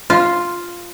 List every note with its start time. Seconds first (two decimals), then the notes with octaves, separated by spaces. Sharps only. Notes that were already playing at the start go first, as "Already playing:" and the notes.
0.10 F4